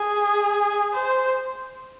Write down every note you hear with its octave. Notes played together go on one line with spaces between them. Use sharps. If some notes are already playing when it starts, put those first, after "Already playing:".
Already playing: G#4
C5